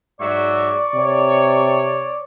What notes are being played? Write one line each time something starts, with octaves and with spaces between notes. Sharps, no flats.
G#2 F#3 D5 E5 C#6
C3 C#5